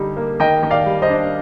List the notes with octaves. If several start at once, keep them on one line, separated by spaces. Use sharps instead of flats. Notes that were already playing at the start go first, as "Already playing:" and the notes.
Already playing: D3 G3 D#4
A#3
D#3 D#5 G5
D#3
D5 F5
G3
C5 D#5
D4